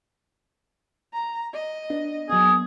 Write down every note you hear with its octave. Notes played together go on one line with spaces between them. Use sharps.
A#5
D#5
B3 D4
F#3 A#3 B3 G#4